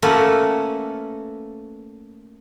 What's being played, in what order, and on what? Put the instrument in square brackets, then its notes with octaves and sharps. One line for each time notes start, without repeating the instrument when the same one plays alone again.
[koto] A3 A#3 C#4 F#4 A4 B4